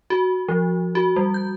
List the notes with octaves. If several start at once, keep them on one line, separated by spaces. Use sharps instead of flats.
F#4
F3
F#4
G3
G6